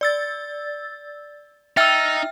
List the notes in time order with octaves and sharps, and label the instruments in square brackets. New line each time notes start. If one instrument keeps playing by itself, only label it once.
[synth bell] D5 E6 A6
[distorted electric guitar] D#4 [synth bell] E5 G5 F6 [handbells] E6 A6